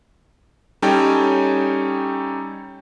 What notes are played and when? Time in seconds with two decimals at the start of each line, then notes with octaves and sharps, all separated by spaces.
0.82 G3 C#4 D#4 A4 C#5 G5